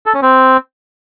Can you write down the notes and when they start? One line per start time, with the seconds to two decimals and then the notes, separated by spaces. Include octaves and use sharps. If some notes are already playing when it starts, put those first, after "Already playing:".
0.06 A4
0.14 C#4
0.22 C4